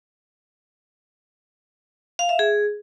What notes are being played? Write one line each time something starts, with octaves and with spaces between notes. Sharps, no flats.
F5
E5
G#4